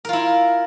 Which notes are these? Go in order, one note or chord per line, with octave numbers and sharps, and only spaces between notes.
E4 F4 A#4